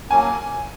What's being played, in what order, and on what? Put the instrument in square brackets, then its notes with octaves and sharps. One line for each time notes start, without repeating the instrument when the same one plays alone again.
[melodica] F#3 A#3 C#4 [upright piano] G#5